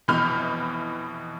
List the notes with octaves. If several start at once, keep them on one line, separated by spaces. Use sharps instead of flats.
F1 B2 E3 B5 F6 G6